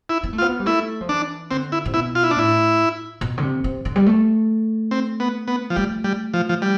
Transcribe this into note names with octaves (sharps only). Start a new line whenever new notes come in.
E4
B3
A3
B3 F4
G3
A3 E4
F3
E3 D4
D3 C4
E4
C3
B2 E4
F4
E4
D4
A2 E4
B2
D3
C3
C3
D3
G3
A3
C4
B3
B3
F3
G3 A3
G3
F3
F3
G3